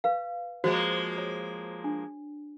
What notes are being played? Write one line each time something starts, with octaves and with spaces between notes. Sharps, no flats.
B4 F5
F3 G#3 A#3 F#4 C5 C#5
C#5
D4